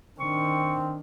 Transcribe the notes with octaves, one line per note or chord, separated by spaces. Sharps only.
D#3 C4 D4 C#6